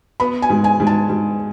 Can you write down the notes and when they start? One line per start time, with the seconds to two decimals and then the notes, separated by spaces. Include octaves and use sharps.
0.20 B3 B5
0.42 G#5
0.50 G#2
0.64 G#5
0.80 G#2
0.87 A5
1.09 G#2